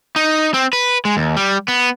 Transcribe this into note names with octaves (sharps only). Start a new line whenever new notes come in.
D#4
C4
B4
G#3
D#2
G3
B3